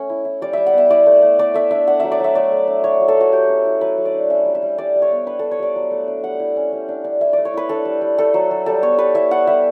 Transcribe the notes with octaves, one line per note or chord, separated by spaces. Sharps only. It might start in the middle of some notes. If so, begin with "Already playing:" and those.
Already playing: A3 C#4
E4
E4
G3 D5
G3 E5
F#5
B3 E5
E4 D5
A3
A3
A3 D5
A3 E5
D4 E5
D4 F#5
F#3 E5
D5
F#3 E5
A3 D5
A3
D4
D4 C#5
F#3
A4
A3 F#4
F#3 G4
C#4
E4
F#3 B4
F#3
D5
D4
C#4 E5
G3
E5
G3
G3 D5
G3
C#5
B3
D4 B4
D4 A4
C#5
G3 D5
F#3
A3
D4
G3 F#5
E4
C#4
G3
D4
D4
E4 E5
A3 D5
C#5
E4 B4
D4 A4
G3
G3
A3 A4
F#3
F#3
G3 A4
B3 C#5
G3 B4
E4 E5
G3 F#5
G3 E5